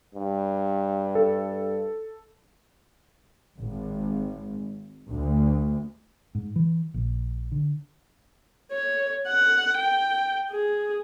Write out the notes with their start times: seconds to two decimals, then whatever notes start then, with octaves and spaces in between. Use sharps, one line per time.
0.15 G2
1.15 A4
3.58 G#1
5.11 D2
6.35 G#2
6.56 E3
6.94 A#1
7.52 D3
8.72 C#5
9.28 F#5
9.77 G5
10.51 G#4